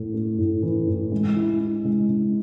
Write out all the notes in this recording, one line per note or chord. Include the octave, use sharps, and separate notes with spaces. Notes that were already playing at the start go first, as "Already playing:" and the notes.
Already playing: A2 A3
A3
A2
E3
A2
G#3
E4
E4
G#3
G#3